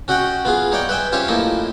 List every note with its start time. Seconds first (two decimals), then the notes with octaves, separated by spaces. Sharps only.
0.08 C#4 F#4 D#5 F#5 G5
0.45 B3 F4 G#4
0.72 D#4 C#5 D5 G5
0.89 B4 D#5 E5 G5 G#5
1.12 C#4 F4 G4 C5 C#5 E5
1.28 A2 F3 A#3 D#4 E4